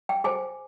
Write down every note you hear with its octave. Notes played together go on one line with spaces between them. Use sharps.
G5
G#4 C5 G#5